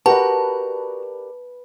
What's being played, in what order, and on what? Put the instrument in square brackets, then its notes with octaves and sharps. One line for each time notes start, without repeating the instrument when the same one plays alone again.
[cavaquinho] F#4 [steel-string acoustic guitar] G4 A#4 D5 [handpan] B4 [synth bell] A5